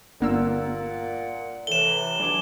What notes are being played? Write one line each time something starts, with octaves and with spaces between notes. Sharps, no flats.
G1 A#2 A#3 D5 F#5 E6
A2 C3 E3 E7 G7
F#3 D4 G#5 D6